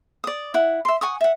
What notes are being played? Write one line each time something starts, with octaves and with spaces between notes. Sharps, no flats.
D5 D#6
E4 F#5
E5 C6
F#5 G#5 C#6 D#6
E5 F#5